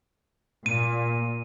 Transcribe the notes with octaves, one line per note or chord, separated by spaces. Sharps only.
A#2 D#7